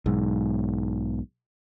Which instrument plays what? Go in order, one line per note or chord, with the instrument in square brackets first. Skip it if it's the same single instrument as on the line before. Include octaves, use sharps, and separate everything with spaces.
[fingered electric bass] B1 G#2